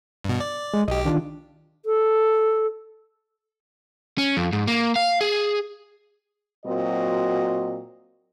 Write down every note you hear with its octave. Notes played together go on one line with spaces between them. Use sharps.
G2 B2
D5
G#3
B1 G4 D#5
D#3 D4 F4
A4
C#4
F2
G#2
A#3
F5
G#4
A#2 F#3 C4 F#4 D#5